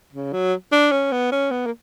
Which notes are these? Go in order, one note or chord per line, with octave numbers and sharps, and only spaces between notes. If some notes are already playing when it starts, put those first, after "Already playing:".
C#3
F#3
D4
C#4
B3
C#4
B3
A#3